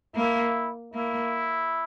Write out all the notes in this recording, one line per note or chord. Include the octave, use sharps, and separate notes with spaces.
A#3 E4
A#3 E4